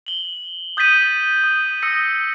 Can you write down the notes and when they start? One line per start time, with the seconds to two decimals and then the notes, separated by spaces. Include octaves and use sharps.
0.06 F#7 G7
0.77 D#6 G6 A6 B6 D#7 G7
1.44 D#6
1.82 D#6 E6 A#6 C#7